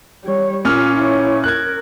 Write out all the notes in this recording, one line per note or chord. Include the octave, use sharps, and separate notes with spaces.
G3 C#5
A#2 C#4 F4 F6
E4 C#5
A#4 F#6 G#6